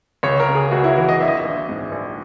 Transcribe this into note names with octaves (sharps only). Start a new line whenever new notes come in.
C#2 C#5
A#4
C#3
G#4
C#2 F#4
E4
E3 F#4
D#5
A#1 E5
D#5
E5
A#1
G#2
A#1